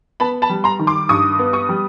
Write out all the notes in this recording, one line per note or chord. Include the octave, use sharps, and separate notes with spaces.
B3 A5 B5
A5 B5
G3
A#5 C6
D#3
C6 D6
G2 C#6 D#6
B3
C#6 D#6
G3